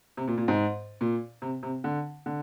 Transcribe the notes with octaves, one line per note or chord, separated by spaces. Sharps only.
C3
A#2
A#2
G#2
A#2
C3
C3
D3
D3